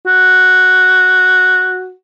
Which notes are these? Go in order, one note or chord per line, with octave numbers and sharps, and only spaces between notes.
F#4